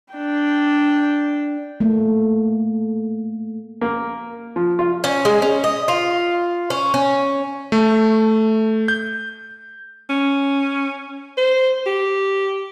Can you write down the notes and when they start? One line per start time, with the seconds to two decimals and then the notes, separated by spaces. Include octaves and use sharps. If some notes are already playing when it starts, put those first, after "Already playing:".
0.15 D4 G5
1.80 A3 A#3
3.81 A#3
4.56 F3
4.79 F4
5.04 C#4
5.25 G#3
5.42 C#4
5.64 D#5
5.88 F4
6.70 C#4
6.94 C#4
7.72 A3
8.88 G6
10.10 C#4
11.37 C5
11.86 G4